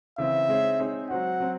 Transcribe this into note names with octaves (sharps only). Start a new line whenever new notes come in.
C#3 E3 C4 E5
G#3 C4 D#4 G#4 C#5
G#3 C4 D#4 G#4 C#5
F#3 C4 F#4 C5 F#5
F#3 C4